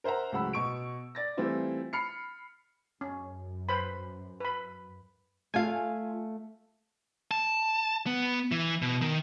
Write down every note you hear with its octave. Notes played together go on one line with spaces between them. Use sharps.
A#4 C5 E5 F#5 A#5
C#2 A2 F#3 F#5 B5 E6
B2 C#6 D7
D5 A6 A#6
E3 G3 A3 C4 E4 F4
B5 F6 C7 C#7
F#2 C#4
B4 C5 B5
B4 B5
A3 F4 F5 G#5
A5
B3
E3
B2
D#3